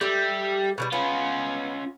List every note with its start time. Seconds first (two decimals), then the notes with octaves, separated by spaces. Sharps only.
0.01 G3 G4 A4 E5
0.78 B2 E3 G3
0.93 B3 C#4 F4